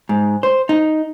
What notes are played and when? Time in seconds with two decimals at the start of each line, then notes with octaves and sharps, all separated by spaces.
0.09 G#2
0.43 C5
0.69 D#4